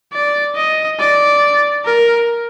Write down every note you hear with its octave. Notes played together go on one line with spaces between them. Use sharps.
D5
D#5
D5
A#4